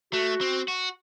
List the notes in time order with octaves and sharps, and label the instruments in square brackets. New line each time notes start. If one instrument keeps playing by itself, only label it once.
[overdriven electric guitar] A3 [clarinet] F#4
[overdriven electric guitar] C4
F#4